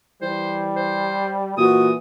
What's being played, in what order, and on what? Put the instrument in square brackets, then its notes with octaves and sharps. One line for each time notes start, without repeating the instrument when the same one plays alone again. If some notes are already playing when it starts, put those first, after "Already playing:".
[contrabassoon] E3 [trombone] G3 [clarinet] C5
[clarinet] C5
[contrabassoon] A#2 [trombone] E3 [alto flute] F#4 [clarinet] D#6